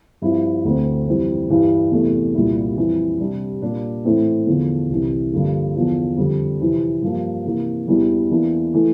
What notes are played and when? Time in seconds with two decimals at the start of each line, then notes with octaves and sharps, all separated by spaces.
0.22 G2 F3 C4 E4
0.65 D2 D3 A3 C4
1.08 F2 E3 G3 C4
1.50 G2 E3 G3
1.92 E2 C3 E3 A3
2.35 C2 A#2 G3 A#3 E4
2.77 F2 E3 G3
3.20 C3 G3 D4
3.62 A#2 G3 A#3 D4
4.05 A2 E3 A3 C4 E4
4.47 E2 D3 F3
4.90 C2 C3 E3
5.32 G2 D3 F3 A#3
5.75 E2 D3 F3
6.17 F2 D3 G3
6.60 F2 C3 E3
7.02 G2 F3 A#3
7.45 C3 E3 A#3
7.87 E2 E3 G3 D4
8.30 E2 E3 A#3 D4
8.74 E3 A3